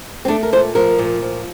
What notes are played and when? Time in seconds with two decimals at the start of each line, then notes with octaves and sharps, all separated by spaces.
0.25 C4
0.28 A3 D4
0.43 A#4
0.53 A#2 C5
0.75 F3 A#4
0.99 A#2
1.21 F3